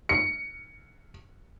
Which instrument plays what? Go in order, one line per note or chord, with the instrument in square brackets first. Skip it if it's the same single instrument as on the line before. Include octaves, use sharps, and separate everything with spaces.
[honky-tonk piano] C#7